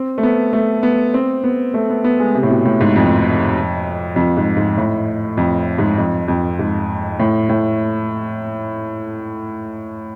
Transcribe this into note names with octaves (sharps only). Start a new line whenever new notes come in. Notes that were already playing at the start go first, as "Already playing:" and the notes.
Already playing: C4
A3
B3
A3
B3
C4
B3
A3
B3
B3
G#3
C3
A2
B2
A2
G#2
F2
F2
G#2
G#2
A2
F2
G#2
F2
F2
G#2
A2
A2